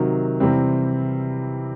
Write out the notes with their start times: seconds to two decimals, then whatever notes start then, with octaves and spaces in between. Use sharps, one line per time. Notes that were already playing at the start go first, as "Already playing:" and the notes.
Already playing: C3 D#3 F#3
0.40 C3 E3 G3 C4